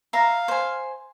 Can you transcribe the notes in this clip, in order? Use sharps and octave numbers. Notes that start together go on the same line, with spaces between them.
E5 F5 A#5
C5 G#5